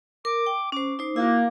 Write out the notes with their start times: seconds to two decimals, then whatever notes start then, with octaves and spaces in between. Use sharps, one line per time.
0.25 A#4 D6
0.46 G5
0.72 C#4 C5 D6
0.99 D#4 C5
1.16 A#3 E4 F#4